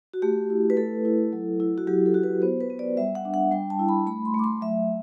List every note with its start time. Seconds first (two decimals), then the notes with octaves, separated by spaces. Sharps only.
0.13 F#4
0.22 A3 G4
0.50 E4
0.70 B4
0.77 A3 A4
1.05 E4
1.33 F#3
1.60 E4
1.78 F#4
1.87 F#3 G4
2.06 A4
2.14 F#4
2.23 B4
2.42 B3 C5
2.60 B4
2.70 B3
2.79 D5
2.97 G3 E5
3.15 F#5
3.25 D4
3.34 F#5
3.52 G3 G5
3.70 A5
3.79 E4
3.89 B5
4.07 A3 B5
4.25 C6
4.34 A3 D6
4.44 C6
4.61 F#3 E5